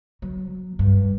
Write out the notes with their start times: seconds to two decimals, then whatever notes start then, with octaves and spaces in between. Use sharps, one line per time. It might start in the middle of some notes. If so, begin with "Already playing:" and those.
0.22 F#3
0.79 G2